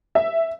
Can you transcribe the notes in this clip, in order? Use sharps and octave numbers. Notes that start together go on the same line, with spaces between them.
E5